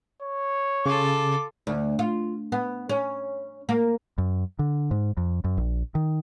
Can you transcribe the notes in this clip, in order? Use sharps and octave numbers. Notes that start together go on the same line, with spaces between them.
C#5
C#3 F4 A4 D6
D2
F4
B3
C#4
A#3
F#2
D3
G#2
F2
F#2
A#1
D#3